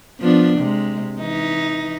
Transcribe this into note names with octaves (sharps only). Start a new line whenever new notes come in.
F3 B3 D4
C3 G#3
E3 D#4